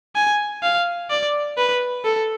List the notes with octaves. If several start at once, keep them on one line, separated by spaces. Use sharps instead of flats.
G#5
F5
D5
B4
A4